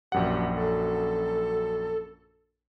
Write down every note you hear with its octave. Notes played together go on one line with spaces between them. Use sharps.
A#1 F#2 G4 F#5
A4